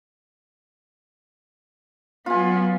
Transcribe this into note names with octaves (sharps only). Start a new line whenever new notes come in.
F#3 B3 F4 G#5